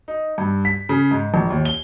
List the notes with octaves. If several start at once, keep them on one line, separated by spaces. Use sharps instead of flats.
D#4
G2
B6
C#3
G#2
A#1
D#2
G7